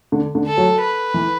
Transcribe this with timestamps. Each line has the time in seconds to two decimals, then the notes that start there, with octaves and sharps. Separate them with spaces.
0.12 D3
0.35 D3
0.47 A4
0.57 F#3
0.80 B4
1.14 E3